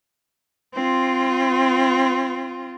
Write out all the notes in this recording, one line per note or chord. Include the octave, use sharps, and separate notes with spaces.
C4 F4